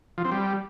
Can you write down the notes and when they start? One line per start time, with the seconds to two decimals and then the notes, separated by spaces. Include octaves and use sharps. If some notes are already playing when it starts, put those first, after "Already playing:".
0.18 F3
0.25 C4
0.32 G3